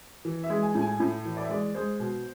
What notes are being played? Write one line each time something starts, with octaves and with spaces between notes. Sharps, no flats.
E3
E5
G#3
G#5
A2
G#5
A2
E3
D5
E5
G#3 D5
G#3 C5
B2